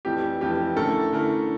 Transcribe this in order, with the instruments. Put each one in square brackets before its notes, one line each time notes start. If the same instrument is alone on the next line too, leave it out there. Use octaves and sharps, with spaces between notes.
[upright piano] F1 F2 E3 [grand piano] G4
[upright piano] F1 F2 E3 [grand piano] G4
[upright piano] D3 A3 C#4 E4 A#4 [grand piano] A4
[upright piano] D3 A3 C#4 E4 A#4